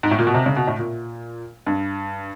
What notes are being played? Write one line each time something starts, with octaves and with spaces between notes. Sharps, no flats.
G#2
A2
A#2
B2
C3
C#3
B2
A2
A#2
G2